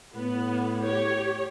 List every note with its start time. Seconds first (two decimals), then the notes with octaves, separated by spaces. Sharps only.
0.14 A2 B3
0.82 G4 C#5